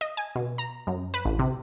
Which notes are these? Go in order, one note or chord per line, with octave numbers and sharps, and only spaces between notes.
D#5
G#5
B2
A#5
F#2
B4
A1
C3